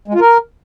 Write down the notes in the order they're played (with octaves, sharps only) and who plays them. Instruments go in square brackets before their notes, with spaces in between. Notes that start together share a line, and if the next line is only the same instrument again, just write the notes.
[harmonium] G#3
F4
A#4